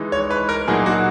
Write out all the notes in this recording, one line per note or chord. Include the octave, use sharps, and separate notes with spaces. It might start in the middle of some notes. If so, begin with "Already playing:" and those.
Already playing: E3 G#3 D#4
C#5
B4
A#4
A#2 F#3 A#3 D#4 G#4
F#4